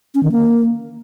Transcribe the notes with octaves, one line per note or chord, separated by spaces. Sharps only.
C#4
D#3
A#3